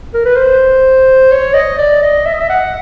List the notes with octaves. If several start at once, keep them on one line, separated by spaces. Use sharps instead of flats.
A#4
B4
C5
C#5
D#5
D5
D#5
E5
D#5
E5
F#5